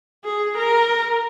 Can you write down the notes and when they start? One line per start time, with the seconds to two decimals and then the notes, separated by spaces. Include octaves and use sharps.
0.25 G#4
0.57 A#4